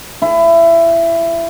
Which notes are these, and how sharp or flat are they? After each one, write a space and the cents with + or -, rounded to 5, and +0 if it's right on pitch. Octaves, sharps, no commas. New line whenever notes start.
E4 +20